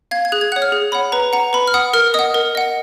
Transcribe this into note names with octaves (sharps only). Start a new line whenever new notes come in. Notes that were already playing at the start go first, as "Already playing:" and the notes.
F5 G#6
G#6
G#4 F#6
G#6
C#5 F#5 F#6
F6
G#4
C#5 F#5 B5
B4 A#5
F#5 A#5
B4 B5
F6
F#5 D#6
A#4 F6
D#5 F#5 D#6
A#4
D#5 F#5